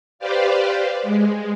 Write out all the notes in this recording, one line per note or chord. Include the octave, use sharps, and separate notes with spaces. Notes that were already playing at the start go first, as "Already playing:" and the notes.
G4 B4 C5 D5 F5
G#3